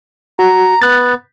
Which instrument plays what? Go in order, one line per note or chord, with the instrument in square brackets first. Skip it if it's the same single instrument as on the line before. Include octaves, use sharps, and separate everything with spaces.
[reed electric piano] F#4 [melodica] A#5
[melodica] B3 [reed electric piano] F#6 A6